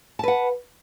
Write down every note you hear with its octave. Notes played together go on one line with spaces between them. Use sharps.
B4 F#5 A5